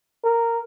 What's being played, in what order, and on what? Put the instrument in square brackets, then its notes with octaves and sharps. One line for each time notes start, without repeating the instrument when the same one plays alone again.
[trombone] A#4